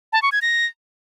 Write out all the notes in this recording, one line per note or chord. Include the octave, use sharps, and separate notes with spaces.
A5
C#6
G#6
A#6